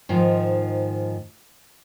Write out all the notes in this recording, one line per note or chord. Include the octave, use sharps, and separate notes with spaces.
G#2 D#3 F3